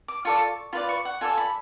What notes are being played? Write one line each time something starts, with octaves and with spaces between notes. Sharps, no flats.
D6
F4 A4 D5 C#6
F4 B4 D5 B5
C#6
F#5
F4 A4 D5 G#5
B5